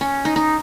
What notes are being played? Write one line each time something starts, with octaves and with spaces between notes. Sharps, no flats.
C#4
D#4
D#4